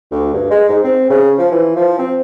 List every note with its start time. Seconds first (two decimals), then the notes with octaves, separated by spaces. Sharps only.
0.11 D2
0.34 G2
0.50 G#3
0.69 G#2
0.84 C4
1.10 C#3
1.38 F3
1.51 E3
1.76 F3
1.98 C4